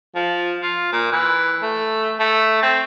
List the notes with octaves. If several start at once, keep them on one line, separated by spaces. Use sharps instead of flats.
F3
F4
A#2
E3
A3
A3
C4